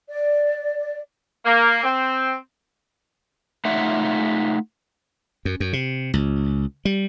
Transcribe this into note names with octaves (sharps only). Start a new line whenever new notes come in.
D5
A#3
C4
A3 D#4 F4 E5 F#5
F#2
F#2
C3
C#2
G3